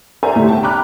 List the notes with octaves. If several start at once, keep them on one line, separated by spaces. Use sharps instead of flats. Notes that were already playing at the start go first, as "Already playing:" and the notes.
A#4 C5 D5 E5 G#5 A#5
D2 A2 C3 A3
G1 G5 A5
G5 A#5 B5 D6 F6 F#6